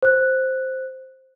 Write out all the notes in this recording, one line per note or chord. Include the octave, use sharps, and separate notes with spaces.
C5 F#6